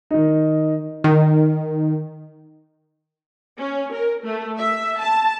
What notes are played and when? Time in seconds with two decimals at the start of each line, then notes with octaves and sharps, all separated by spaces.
0.11 D#3 D#4
1.04 D#3
3.58 C#4
3.93 A#4
4.23 A3
4.58 E5
4.99 A5